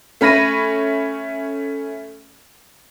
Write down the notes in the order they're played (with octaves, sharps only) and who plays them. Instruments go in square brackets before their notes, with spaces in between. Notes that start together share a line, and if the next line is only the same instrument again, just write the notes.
[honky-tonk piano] A3 C#4 B5 A#6 D#7